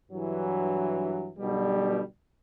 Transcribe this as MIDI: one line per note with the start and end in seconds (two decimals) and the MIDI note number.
0.12 1.30 43
0.12 1.30 52
0.12 1.30 54
1.38 2.01 35
1.38 2.01 47
1.38 2.01 50
1.38 2.01 55